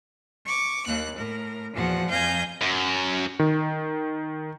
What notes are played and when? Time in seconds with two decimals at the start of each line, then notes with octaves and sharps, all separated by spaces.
0.46 C#6 D6
0.87 D#2 A#3 F#6
1.16 A2 A#4
1.74 E2 A#2 F3 F#4 F#5
2.10 F2 F5 G#5 G6 G#6 A#6
2.62 F#2
3.39 D#3